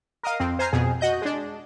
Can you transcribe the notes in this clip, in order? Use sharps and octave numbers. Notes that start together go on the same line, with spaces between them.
A#4 D#5 F5
F2 C4
C5 G#5 A#5 F6 C7
F2 B2 G#4
F#4 D#5 G6
G#3 D4